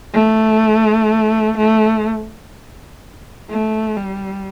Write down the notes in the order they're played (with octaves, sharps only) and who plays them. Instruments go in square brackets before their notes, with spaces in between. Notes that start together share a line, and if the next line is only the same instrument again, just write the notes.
[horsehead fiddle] A3
A3
A3
G3